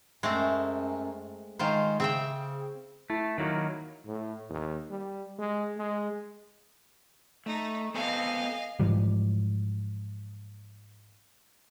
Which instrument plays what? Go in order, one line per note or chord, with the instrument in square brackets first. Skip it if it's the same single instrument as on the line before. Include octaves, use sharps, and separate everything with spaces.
[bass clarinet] F#2 [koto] G#3 A3 C4
[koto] D#3 F4 C5 [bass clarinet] G#3
[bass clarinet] C#3 [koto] C4 E5 G5
[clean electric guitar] A3 [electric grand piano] E4
[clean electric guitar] D#3 F#3 A#3
[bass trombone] A2
D#2
G3
G#3
G#3
[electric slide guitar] A3 [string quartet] D#4
[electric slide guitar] B3 C4 A4 [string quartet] D#5 F5 G#5
[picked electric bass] G#2 E3 F3 G3